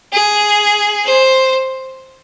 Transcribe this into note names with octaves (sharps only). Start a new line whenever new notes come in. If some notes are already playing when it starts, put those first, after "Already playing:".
G#4
C5